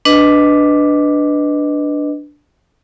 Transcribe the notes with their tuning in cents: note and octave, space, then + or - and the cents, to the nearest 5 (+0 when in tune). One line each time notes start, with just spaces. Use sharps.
D4 +0 B4 +5 D#5 +0